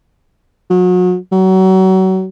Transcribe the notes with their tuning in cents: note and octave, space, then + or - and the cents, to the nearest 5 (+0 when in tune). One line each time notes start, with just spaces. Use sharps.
F#3 -35
F#3 +30